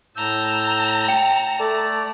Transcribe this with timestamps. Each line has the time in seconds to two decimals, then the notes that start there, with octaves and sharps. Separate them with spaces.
0.16 A2 A5 A#5 E6 G6
1.08 G5
1.60 A3 A4 D5